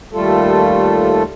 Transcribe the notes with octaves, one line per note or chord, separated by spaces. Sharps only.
D#2 G3 A3 F4 A4